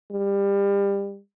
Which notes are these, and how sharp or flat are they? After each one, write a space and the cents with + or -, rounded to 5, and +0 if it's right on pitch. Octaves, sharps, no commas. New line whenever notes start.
G3 +25